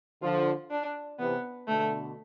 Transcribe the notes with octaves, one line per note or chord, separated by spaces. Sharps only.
D3 F3 F4
D4
C3 E3 B3
B2 D3 A3